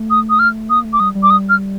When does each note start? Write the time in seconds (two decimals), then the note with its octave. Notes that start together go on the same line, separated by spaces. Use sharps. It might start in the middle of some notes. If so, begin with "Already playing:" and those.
Already playing: A3
0.10 D#6
0.30 D#6
0.39 F6
0.70 A#3 D#6
0.85 A3
0.93 D6
1.00 G3 D#6
1.15 G3
1.23 D6
1.30 D#6
1.49 F6